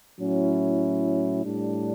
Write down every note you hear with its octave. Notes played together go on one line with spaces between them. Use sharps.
A2 F#3 C#4 E4
A2 G3 D4